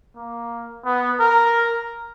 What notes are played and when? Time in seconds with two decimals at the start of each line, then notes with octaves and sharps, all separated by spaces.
0.16 A#3
0.85 B3
1.20 A#4